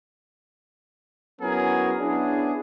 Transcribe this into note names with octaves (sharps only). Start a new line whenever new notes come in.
F#3 B3 C#4 E4 G#4 A#4
B3 C#4 D4 E4 G#4